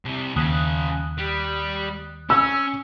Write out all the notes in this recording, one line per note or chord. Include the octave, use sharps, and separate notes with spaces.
C2 C3
D#2 C#3 F#3 D#6 F#6
G3
C#4 E6